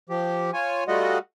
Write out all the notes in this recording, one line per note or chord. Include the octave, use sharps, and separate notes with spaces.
F3 G4
F4 C#5 G#5
G3 A3 F4 F#4 D#5 F#5